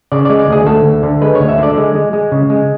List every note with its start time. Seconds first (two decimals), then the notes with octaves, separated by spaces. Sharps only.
0.12 C#3 D5
0.25 G#3 D5
0.39 D5
0.48 D2 G#4
0.66 D2 A4
0.85 D2
1.03 D3
1.22 G#3 B4
1.35 C#5
1.40 D2
1.49 E5
1.58 D3 D5
1.77 G#3
1.95 G#3
2.13 G#3
2.32 C#3
2.50 G#3